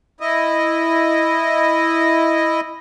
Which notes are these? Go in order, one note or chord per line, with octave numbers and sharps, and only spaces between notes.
E4 D#5